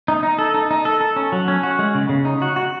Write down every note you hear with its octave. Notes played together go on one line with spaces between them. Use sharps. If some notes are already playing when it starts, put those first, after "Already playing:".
D#4
D#4
A4
D#4
D#4
A4
A4
C#4
F#3
C#4
F#4
G#3
C#3
C#3
D#4
F#4
F#4